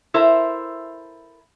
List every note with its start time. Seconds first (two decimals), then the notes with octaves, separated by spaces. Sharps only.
0.14 E4 A4 A#4 C5 E5